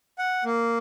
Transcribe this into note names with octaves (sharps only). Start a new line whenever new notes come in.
F#5
A#3